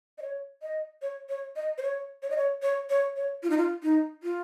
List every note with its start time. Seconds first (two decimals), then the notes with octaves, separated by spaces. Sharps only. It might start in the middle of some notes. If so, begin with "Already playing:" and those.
0.18 D#5
0.22 C#5
0.62 D#5
1.02 C#5
1.29 C#5
1.56 D#5
1.78 C5
1.82 C#5
2.23 C#5
2.30 D#5
2.37 C#5
2.62 C#5
2.90 C#5
3.16 C#5
3.43 F4
3.50 D#4
3.57 F4
3.83 D#4
4.23 F4